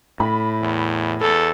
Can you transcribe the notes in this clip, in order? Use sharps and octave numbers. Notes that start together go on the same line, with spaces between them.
A2 B5
E2
E2 A4